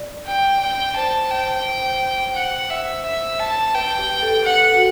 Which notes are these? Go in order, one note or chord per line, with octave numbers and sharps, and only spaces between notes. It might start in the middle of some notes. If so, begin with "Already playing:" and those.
Already playing: D5
G5
G5
C5 A5
G5
F#5
E5
E5
A5
B4 G5
G4
A4
F#5
F#4